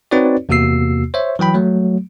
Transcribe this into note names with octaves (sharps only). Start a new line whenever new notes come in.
C4 D#4 F#4 B4 C#5 D5
E2 C3 A#3 F#4 E6 C7
C5 C#5 E5
E3 F#3 G5 B5
F#3 A3